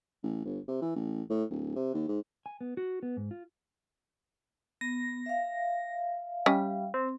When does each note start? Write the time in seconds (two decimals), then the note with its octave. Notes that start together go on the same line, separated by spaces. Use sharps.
0.23 A1
0.45 G1
0.68 C3
0.82 E3
0.96 A1
1.30 A2
1.50 D1
1.76 C3
1.94 D#2
2.08 G#2
2.46 G#5
2.61 B3
2.77 F#4
3.03 B3
3.17 G#2
3.31 F4
4.81 B3 A#6
5.26 E5 F5
6.46 G3 C#4 D#5
6.94 C4